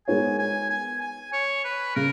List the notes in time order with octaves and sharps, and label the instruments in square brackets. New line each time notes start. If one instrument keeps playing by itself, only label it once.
[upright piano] G#3 B3 D#4 A#4 C#5 [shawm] G#5
[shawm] G#5
G#5
G#5
C#5
B4
[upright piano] C#3 [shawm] A#4